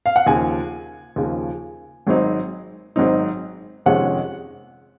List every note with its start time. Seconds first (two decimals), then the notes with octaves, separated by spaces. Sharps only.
0.06 F5
0.16 F#5
0.26 D#2 C#3 F3 G#5
1.16 D#2 C#3 F3
2.07 G#1 G#2 F#3 C4 D#4
2.96 G#1 G#2 F#3 C4 D#4
3.86 F2 C3 D#3 G#3 C#4 F#5